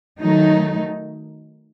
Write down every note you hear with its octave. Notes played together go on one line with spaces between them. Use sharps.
D#3 F#3 A3 D#4